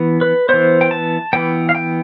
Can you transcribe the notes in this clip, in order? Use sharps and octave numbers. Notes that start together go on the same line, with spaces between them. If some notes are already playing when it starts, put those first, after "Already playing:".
Already playing: E3 B3
B4
E3 B3 C5
G5
A5
E3 B3 G5
F5
G5